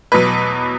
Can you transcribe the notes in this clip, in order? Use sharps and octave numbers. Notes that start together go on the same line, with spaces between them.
E2 B2 F#3 B4